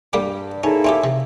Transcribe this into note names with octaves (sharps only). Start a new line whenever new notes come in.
G2 G3 A#3 G4
A#3 C#4 D#4 E4 G#4 A4 F5
C4 C#4 G4 E5
C3